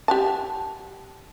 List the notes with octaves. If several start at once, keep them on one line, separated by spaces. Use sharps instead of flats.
G4 F#5 A5